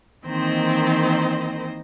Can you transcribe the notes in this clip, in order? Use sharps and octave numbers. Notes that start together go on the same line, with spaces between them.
D#3 E3 A#3 C4 C5 D#5